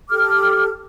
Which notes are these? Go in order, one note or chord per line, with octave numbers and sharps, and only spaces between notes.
G4 A4 D6 F6